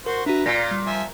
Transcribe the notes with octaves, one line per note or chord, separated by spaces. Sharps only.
F#4 A#4 C5
D4 F#4 B4 E5 A#5
A#2 F4 A#6
G3
F3 E5 G#5